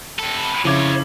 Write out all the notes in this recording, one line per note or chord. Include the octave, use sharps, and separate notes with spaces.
C3 A4 B5
F2 C#3 F3 E4 C#5 D6 G#6